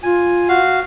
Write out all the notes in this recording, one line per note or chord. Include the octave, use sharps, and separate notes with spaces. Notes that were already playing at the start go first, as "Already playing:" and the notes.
F4 G#5
F#4 F5